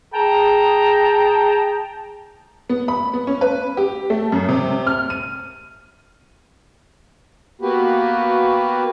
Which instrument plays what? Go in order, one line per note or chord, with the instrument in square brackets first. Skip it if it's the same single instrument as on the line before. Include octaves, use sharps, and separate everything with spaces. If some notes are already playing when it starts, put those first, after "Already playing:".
[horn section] G#4 G5 A5 A#5
[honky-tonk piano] B3
B5
B3
C#4
B4
G4
A3
F#2
C3
F6
D#7
[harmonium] A#3 B3 F#4 G4 B4